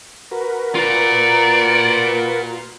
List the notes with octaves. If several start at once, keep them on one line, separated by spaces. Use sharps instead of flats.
F#4 A#4 B4
F4 D5 A#5